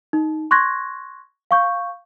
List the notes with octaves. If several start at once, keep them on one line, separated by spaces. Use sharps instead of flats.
D#4
C6 C#6 F#6 G#6 A#6
F5 C#6 G6